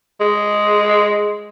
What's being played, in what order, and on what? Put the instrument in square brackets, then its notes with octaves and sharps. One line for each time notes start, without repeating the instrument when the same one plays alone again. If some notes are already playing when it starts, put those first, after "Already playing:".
[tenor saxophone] G#3